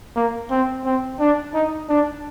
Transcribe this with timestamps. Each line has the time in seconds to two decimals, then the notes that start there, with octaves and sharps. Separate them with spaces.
0.16 A#3
0.51 C4
0.85 C4
1.20 D4
1.54 D#4
1.89 D4